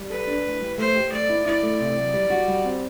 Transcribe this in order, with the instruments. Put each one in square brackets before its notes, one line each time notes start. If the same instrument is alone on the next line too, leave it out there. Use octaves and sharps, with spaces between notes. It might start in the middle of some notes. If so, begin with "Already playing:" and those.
Already playing: [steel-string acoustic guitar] G3
[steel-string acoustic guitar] A4 [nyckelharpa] B4
[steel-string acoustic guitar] D4
A2
G3
[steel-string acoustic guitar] A3 [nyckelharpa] C5
[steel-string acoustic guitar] G4
[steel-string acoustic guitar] A3 [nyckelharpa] D5
[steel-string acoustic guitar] E4
[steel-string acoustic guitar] E4 [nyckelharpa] D5
[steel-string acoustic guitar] A3
C3
F#3
G3
F#4
G3
C4